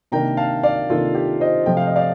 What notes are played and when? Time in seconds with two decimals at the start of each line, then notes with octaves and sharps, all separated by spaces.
0.12 C3 D#3 A#3 D4 G5 A#5
0.37 F5 A5
0.63 D5 F5
0.90 C3 D#3 A#3 D4 F4 A4
1.15 G4
1.40 C5 D#5
1.66 C3 F3 A3 G5
1.77 F5
1.86 D#5
1.96 D5 F5